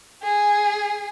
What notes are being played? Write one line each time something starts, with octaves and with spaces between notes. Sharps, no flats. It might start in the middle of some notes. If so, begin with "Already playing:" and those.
G#4